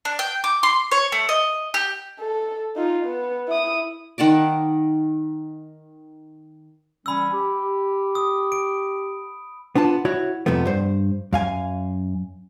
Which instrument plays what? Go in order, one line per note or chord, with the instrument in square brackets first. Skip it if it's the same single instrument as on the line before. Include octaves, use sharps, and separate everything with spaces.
[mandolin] D4
G5
D6
C6
C#5
A3
D#5
G4
[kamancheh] A4
D#4 F4
B3
E4 D#6
[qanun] D#3 F#5 A5 D6
[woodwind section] E3 G3 C#4 [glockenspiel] B5 E6
[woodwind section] G4
[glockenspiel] D#6
D7
[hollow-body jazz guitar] B3 D4 F4 A5
E4 F#4 C#5
F2 C3 F3 A3 B3
G2 C5
F#2 F5 G#5